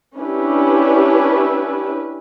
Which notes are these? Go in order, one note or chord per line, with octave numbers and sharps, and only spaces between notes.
C#4 D4 E4 G4 B4